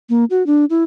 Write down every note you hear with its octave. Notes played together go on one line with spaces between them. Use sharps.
A#3
F#4
D4
E4